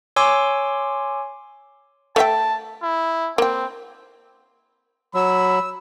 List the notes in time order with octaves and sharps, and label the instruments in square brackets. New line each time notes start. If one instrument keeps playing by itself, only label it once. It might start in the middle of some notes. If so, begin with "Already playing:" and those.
[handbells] C#5 G#5 C6 D6 E6
[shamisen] A3 E5 G5 [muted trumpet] A5
[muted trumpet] E4
[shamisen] A#3 G5 [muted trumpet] C4
[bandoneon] F#3 [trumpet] B5 [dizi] E6